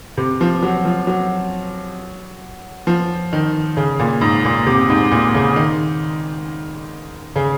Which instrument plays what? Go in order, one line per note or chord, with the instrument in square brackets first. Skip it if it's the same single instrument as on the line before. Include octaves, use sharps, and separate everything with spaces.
[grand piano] C3
F3
F#3
F3
F#3
F3
D#3
C#3
A#2
G#2
A#2
C3
G#2
A#2
C#3
D#3
C#3